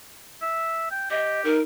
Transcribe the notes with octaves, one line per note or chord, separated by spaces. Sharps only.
E5
G5
G4 D#5
D#4 A#4